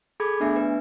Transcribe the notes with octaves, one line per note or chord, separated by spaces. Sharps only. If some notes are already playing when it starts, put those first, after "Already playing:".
G#4 A4 B5 D6 G#6
A3 B3 D4 E5 G#5
B4